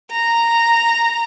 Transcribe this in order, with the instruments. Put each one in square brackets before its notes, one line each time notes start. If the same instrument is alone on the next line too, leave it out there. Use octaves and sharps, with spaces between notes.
[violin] A#5